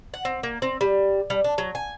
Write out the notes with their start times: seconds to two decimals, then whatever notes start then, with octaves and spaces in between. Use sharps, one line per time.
0.14 F#5
0.25 C4
0.43 A#3
0.62 C4
0.81 G3
1.30 G3
1.44 D4
1.58 F#3
1.75 G#5